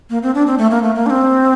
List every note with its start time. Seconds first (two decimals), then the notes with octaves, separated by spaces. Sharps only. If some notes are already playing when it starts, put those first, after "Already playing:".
0.10 A#3
0.23 C4
0.35 D4
0.47 C4
0.58 A3
0.71 A#3
0.83 A3
0.95 A#3
1.06 D4
1.10 C4